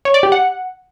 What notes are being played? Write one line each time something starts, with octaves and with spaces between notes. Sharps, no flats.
C#5
D5
G4
F#5